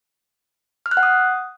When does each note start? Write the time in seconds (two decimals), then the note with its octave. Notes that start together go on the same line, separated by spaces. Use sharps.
0.86 F6
0.91 F#6
0.97 F#5
1.03 D#6